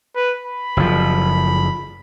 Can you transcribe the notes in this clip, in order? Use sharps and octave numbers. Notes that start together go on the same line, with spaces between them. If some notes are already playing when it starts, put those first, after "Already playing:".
B4
B5
F#1 F3